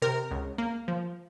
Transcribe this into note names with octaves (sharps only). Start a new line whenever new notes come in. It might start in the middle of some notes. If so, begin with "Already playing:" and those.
C3 A#4
C#2
A#3
F3